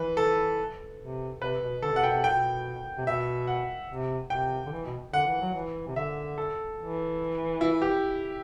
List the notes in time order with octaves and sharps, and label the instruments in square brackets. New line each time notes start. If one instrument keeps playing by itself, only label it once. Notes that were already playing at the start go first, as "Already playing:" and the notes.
Already playing: [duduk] E3 [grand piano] B4
[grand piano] A4
[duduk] C3
[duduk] C3 [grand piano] B4
[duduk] B2
[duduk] D3 [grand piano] A4
[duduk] C3 [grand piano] F#5
[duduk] B2 [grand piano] G5
[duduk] C3
[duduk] B2 [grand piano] G5
[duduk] C3
[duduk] B2 [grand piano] E5
[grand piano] F#5
[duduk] C3
[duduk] C3 [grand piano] G5
[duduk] D3
E3
B2
[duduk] D3 [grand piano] F#5
[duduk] E3
F#3
E3
C3
[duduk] D3 [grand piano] E5
[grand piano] A4
[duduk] E3
[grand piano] E4
G4